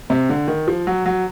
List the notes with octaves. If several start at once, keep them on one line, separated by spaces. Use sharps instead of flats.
C3
D3
D#3
F3
F#3
F#3